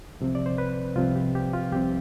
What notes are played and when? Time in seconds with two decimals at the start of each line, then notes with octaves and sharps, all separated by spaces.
0.20 C2 C3 F3 C4
0.35 D5
0.46 C5
0.58 B4
0.96 C2 C3 F3 C4 F4
1.16 G4
1.35 G4
1.53 F4
1.73 C2 C3 F3 C4 G4